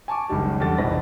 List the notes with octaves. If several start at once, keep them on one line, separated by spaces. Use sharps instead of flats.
G#5 A5 C#6 D6
F#1 C#2 D#3 G3 A5
E2 G2 D3 A4 A6
F1 A#1 B2 E3 B4 A#6